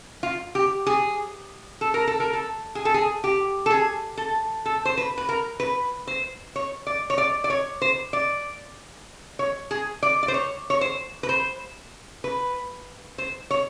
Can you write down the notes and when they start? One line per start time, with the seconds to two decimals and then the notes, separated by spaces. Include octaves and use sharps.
0.23 F4
0.55 G4
0.86 G#4
1.81 A4
1.94 A#4
2.07 A4
2.20 A#4
2.33 A4
2.75 G#4
2.85 A4
2.94 G#4
3.24 G4
3.66 A4
3.71 G#4
4.17 A4
4.65 A4
4.85 C5
4.97 B4
5.18 B4
5.29 A#4
5.60 B4
6.07 C5
6.56 C#5
6.87 D5
7.10 C#5
7.18 D5
7.44 D5
7.50 C#5
7.82 C5
8.13 D5
9.39 C#5
9.71 G#4
10.03 D5
10.23 D5
10.28 C5
10.34 C#5
10.70 C#5
10.81 C5
11.23 B4
11.29 C5
12.24 B4
13.18 C5
13.51 C#5